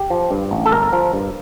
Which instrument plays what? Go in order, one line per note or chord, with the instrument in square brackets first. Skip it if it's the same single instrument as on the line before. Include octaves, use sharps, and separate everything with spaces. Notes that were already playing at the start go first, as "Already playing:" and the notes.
Already playing: [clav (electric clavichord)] G4
F3
G2
A1
A4
G1 A#4
F3
G2